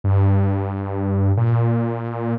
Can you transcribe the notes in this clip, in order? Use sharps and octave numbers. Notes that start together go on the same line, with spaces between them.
G2
A#2